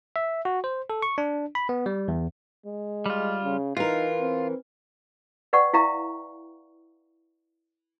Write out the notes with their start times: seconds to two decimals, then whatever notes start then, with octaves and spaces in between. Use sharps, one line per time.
0.16 E5
0.45 F#4
0.64 C5
0.90 A4
1.02 C#6
1.18 D4
1.55 B5
1.69 B3
1.86 G3
2.08 E2
2.66 G#3
3.06 G3 F4
3.42 C#3
3.77 E3 D#4 F4 A#4
4.20 C4
5.53 B4 D5 F#5 G5 C#6
5.73 E4 E5 F5 G5 A#5 C#6